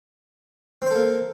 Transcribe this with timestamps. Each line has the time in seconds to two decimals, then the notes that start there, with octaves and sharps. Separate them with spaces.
0.82 C4
0.86 C5
0.91 A4
0.95 A#3